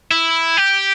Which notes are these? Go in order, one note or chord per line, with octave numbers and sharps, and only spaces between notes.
E4
G4